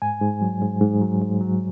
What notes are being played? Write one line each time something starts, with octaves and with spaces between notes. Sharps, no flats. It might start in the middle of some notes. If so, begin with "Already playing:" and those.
G#2 G#5
G#2
F#3
G#2
G#2
F#3
G#2
F#3